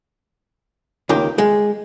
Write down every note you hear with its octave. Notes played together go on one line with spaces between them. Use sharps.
C#2 D#3 A#3 G4
G#3